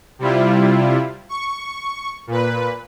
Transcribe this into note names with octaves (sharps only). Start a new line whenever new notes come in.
C3 G3 E4 F4
C#6
A#2 B4